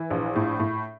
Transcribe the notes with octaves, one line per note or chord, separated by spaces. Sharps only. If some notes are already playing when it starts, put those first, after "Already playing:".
Already playing: E3
A#1
A2
A2